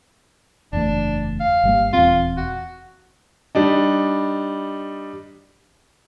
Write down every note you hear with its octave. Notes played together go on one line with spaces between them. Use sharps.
F#1 E2 A3 D4
F5
G#1 G3 A#3
D#1 E2 C4 F4
F#4
G3 D4 D#4